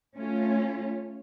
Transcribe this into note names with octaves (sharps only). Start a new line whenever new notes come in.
A3 C#4 F4